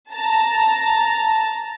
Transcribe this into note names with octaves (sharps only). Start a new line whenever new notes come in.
A5 A#5